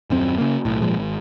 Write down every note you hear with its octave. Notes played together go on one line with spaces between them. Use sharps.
D#1 F#2 C4
C#3 A#3
B1 A2
G#1 A#2 F3 G#3
G#1